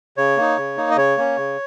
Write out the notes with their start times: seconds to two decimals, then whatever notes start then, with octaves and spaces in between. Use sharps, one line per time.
0.17 C#3 C#5
0.37 A#3 D#4
0.57 C#3
0.77 A#3 D#4
0.91 D#5
0.97 C#3 C#5
1.17 A#3 C#4
1.37 C#3